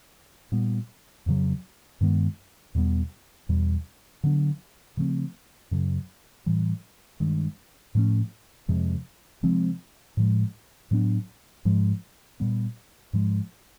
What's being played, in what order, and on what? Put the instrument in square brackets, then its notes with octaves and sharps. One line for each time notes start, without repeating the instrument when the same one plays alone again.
[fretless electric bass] A#2 G3 B3
F2 C#3 F#3
G2 D#3 G#3 B3
E2 B2 G3 B3
E2 B2 G3
D3 F#3 B3 D4
C#3 F3 A3 C4
F#2 C#3 F#3
A2 E3 G3
G2 D#3 G#3
A2 F3 A3 C#4
F2 C3 F3 G#3
C3 F3 G#3 C4
A2 F3 G#3
A2 F#3 B3 D4
G#2 F3 G#3
A#2 G3 B3
G#2 F3 G#3